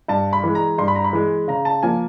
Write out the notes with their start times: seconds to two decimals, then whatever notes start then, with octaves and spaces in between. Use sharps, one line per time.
0.08 G2 A5
0.33 B5
0.44 E3 G#3
0.55 A#5
0.78 G2 C6
0.88 B5
0.96 A#5
1.04 B5
1.13 E3 G#3
1.48 C#3 A#5
1.65 A5
1.83 F3 A#3 G#5